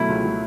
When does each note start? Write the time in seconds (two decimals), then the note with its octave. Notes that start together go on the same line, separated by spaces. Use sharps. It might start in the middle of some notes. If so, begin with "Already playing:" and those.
Already playing: B2 F#3 A3 E4
0.09 C#2
0.24 F#3